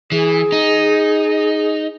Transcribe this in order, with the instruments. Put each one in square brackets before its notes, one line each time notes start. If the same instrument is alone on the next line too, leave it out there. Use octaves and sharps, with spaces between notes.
[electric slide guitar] E3 [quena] G#4
[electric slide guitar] D#4